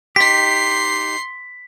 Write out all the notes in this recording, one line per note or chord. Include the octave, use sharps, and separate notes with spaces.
D#4 G4 C6 B6 C7